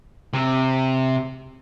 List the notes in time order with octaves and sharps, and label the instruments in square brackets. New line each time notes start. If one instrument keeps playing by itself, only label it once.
[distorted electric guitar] C3